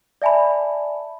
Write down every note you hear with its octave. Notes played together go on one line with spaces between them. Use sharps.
D5 E5 G#5 A5 B5